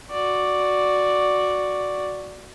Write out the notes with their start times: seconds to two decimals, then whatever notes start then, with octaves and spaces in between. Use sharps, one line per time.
0.11 F#4 D5